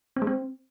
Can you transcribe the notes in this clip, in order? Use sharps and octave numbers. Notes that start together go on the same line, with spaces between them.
C4
G#3
C4